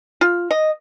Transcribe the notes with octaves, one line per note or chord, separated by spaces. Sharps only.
F4
D#5